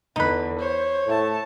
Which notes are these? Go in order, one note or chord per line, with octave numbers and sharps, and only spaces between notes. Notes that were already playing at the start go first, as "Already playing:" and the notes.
E2 D3 D#4 B4
C5 C#5
A2 A3 A5